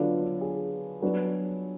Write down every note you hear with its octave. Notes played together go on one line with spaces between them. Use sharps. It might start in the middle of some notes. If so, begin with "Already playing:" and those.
Already playing: D3 F#3 B3 D4 F4 A4
G#4
F#3 B3 D4